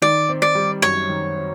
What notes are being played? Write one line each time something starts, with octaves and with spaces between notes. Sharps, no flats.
D#3 D5
C4
D5
G3
F#2 C#5
D#3
C4